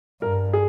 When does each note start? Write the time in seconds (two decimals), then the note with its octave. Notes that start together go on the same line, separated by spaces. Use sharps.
0.21 G2 A#4
0.53 G#4